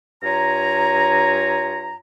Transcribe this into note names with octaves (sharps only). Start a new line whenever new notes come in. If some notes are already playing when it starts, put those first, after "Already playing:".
G2 F4 C#5 G#5 A#5